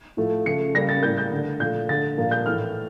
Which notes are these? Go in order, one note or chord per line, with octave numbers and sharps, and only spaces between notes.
A2 F3 A3
C#3 F3 A3 C#7
C#3 G3 A#3 A#6
A6
A2 G3 A#3 G6
G6
D3 A3
A#2 F3 A3 G6
D3 A3 A6
A#2 F3 A#3
G6
A2 E3 A3 F6